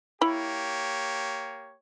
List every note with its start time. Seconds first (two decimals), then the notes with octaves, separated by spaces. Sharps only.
0.21 A#3 E4 G4 C#5 B5